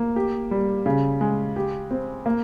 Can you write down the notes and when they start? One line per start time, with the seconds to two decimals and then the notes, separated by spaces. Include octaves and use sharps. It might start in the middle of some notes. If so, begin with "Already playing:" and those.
Already playing: A#3
0.16 G4
0.51 G3
0.86 C#3
1.21 G#3
1.56 G4
1.91 C4
2.26 A#3